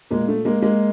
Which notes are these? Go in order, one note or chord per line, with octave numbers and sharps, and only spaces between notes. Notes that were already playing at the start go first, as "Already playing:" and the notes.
A#2 G#3 A#3
A3
G#3 A#3
G#3 A#3